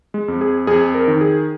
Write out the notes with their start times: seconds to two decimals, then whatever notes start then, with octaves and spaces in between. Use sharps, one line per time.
0.14 G#3
0.28 F2
0.41 G#4
0.67 F2 G#4
0.95 A#4
1.08 D#3
1.21 G#4